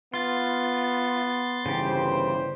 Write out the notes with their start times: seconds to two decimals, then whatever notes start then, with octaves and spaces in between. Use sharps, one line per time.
0.14 B3 F4 C6 A6
1.66 G1 C#3 E3 G4 C5